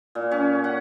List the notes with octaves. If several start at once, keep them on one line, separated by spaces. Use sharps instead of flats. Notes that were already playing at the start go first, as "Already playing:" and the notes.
A#2
C#4
F#5